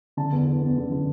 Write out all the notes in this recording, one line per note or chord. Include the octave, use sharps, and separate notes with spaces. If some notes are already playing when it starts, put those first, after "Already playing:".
D3 A5
E2
E2
E2
D3
D3